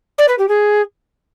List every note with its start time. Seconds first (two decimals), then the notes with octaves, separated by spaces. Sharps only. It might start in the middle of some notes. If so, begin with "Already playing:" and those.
0.18 D5
0.28 B4
0.38 G4
0.48 G#4